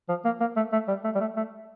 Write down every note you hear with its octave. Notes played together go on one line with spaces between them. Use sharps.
F3
A#3
A#3
A3
A3
G3
A3
G3
A3
A3